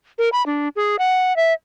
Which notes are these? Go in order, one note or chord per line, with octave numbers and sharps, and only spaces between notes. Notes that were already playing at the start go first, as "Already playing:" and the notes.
A#4
B5
D4
G#4
F#5
E5